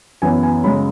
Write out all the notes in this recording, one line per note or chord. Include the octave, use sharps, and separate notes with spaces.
F#2 E3 B3 G#5
G#5
F#2 C#3 G#3 B5